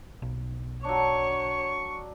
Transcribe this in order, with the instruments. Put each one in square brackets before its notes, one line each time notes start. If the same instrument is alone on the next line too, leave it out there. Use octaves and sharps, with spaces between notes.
[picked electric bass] B1
[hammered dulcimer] F#3 D4 [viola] C#5 [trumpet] C#6